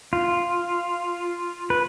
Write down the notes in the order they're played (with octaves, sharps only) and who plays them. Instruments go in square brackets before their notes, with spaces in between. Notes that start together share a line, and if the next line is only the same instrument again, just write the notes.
[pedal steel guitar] F4
B4